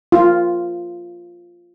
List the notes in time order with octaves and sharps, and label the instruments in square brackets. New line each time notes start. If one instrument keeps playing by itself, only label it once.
[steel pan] F4